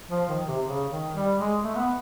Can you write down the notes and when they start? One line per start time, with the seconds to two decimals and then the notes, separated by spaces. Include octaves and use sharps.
0.10 F3
0.29 D#3
0.47 C3
0.66 C#3
0.90 D#3
1.14 G3
1.38 G#3
1.63 A3
1.76 B3